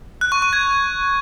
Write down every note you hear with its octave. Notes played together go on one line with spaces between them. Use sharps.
F#6
C#6
C#6
G#6